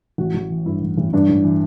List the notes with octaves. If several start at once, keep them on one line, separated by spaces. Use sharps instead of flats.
A1 F#4
A1
E3
G2 E4
A1
A1
G2 D4
A1
E3